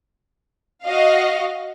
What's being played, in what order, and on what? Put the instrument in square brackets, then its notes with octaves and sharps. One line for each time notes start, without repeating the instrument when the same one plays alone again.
[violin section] F#4 D#5 F5